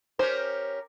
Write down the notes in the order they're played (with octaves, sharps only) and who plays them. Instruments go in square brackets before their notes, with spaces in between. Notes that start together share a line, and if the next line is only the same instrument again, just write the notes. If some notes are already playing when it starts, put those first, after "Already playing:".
[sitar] C#4 G4 A#4 [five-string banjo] C5